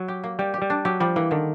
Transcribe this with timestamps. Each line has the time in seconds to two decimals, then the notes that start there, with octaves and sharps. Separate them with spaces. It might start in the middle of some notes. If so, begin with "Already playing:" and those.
Already playing: F#3
0.08 G4
0.24 A#3
0.39 G3 G4
0.54 G4
0.62 G3
0.70 D4
0.85 F#3 G4
1.00 F3 G3
1.16 E3 A#3
1.31 D3 D#3